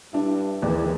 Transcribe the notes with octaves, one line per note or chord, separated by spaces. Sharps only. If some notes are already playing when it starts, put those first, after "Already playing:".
G2 D4 E4
D#2 E3 G#4 D5